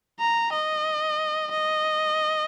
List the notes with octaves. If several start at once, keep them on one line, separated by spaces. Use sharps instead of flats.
A#5
D#5
D#5